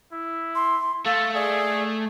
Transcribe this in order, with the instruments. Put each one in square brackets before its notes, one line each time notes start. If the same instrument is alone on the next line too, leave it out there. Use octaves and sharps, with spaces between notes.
[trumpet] E4
[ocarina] C6
[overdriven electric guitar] A3 [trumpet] A4 [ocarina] F5
[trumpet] G#4 [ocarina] D5